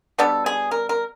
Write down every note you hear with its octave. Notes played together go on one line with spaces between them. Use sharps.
B2 G3 B3 D4 A4
G#4
A#4
A#4